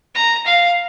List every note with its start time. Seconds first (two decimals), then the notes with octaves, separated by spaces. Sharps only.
0.15 A#5
0.46 F5